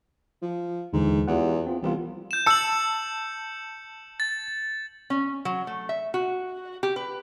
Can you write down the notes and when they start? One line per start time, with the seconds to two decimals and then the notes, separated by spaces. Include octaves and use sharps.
0.42 F3
0.93 D#2 G#2 D3 E3
1.28 E2 F4 G4 F#5
1.67 C4 F4
1.82 C2 E3 B3 F4
2.31 G6 E7
2.46 A5 E6 C#7 F#7
4.20 A6
5.10 C#4
5.45 F#3
5.67 A3
5.89 E5
6.14 F#4
6.83 G4
6.96 B4